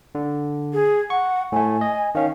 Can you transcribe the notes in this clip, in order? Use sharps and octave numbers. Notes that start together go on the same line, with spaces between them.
D3
G#4
F#5 C#6
A2 A3 G#5
D#5
D#3 C#4 F5